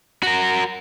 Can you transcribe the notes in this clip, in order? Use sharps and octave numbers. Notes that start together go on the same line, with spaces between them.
F#4 A#4